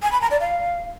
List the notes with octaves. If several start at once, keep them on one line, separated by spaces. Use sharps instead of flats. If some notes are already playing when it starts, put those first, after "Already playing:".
G#5
B5
A#5
D5
F5